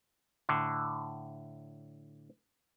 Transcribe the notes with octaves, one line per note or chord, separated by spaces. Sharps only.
A2 D3